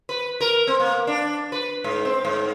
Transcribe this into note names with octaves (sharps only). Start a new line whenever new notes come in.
B4
A#4
C4
A#3
D4
B4
G#2
C4
G#2